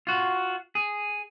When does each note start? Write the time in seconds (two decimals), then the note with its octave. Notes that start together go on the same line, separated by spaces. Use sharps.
0.07 F4 F#4
0.75 G#4